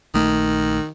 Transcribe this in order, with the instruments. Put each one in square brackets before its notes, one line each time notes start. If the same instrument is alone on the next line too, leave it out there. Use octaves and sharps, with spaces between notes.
[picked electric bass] A#1 A3 [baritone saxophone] D#3